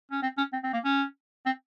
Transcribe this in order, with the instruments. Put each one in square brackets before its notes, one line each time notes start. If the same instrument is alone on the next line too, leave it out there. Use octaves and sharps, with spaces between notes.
[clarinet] C#4
C4
C#4
C4
C4
A#3
C#4
C4